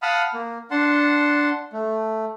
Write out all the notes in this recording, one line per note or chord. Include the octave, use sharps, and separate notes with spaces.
F5 F#5 A5 B5 D#6 F6
A#3
D4 F#5 A5 C6
A3